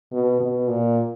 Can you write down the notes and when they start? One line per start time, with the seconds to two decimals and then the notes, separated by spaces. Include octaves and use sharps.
0.12 B2
0.41 B2
0.69 A#2